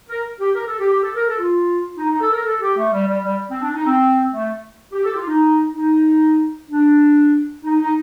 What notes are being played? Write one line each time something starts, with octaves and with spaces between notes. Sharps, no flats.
A#4
G4
A#4
A4
G4
G4
A4
A#4
A4
F4
D#4
D#4
A4
A#4
A4
G4
A3
G3
G3
G3
C4
D4
D#4
C4
A3
G4
A4
G4
F4
D#4
D#4
D4
D#4
D#4